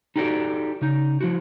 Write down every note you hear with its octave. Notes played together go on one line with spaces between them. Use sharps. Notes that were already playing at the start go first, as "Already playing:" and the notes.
D#4 F#4 G4 A4 D5
C#3 D#4
F3 E4 F#4